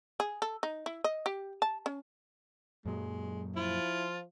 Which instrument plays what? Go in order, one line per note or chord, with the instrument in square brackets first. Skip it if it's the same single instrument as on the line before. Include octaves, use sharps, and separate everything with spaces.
[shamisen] G#4
A4
D#4
E4
D#5
G4
A5
C#4
[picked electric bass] F#2 A#2 F#3 [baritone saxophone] G#3
[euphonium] F3 [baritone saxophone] E4 [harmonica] F4